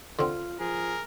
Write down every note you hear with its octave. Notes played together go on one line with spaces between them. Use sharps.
D3 C4 F4
F3 G#4 A#4